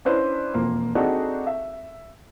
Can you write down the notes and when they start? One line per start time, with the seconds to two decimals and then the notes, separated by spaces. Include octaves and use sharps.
0.05 C#4 D4 E4 B4 C5
0.54 E1 F2 A#3 C6
0.95 C4 D4 D#4 F#4 G#4 A4
1.47 E5